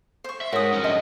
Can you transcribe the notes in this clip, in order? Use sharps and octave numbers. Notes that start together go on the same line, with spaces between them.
C5 C#6
E5
G#2 F#4 A#4 C#5 D#6 B6
F2 C#4
D#5 C6